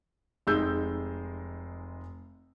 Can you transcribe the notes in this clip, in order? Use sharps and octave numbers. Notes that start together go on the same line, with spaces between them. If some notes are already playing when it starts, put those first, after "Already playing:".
F1 G#3 D#4 E6 G6